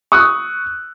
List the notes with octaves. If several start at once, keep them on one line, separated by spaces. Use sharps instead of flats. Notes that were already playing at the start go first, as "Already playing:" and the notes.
C#6 D#6 E6 F#6